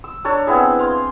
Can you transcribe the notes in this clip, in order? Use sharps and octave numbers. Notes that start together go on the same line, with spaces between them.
E6
D4 A4 C#5 A#5
B3 C4 E4 G#4
F5 C6